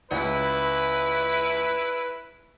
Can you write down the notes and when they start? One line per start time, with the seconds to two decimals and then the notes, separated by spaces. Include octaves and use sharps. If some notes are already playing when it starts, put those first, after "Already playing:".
0.11 C#2 E4 B4